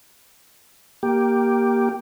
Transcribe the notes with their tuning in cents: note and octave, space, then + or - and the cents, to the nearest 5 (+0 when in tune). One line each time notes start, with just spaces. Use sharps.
A#3 +10 G4 +0